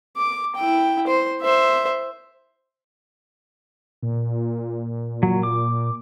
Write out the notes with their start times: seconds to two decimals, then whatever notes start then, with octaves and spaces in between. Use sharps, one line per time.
0.17 D6
0.56 E4 G5
1.07 C5
1.41 C5 E5
4.02 A#2
5.23 F#3
5.43 D6